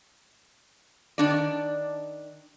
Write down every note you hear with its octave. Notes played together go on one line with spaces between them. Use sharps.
D#3 D4 D5